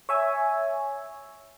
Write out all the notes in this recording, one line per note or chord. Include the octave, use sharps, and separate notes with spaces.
C#5 E5 G#5